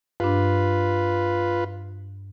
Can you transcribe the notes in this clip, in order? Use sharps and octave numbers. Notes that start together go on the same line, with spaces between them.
G2 D4 F4 B4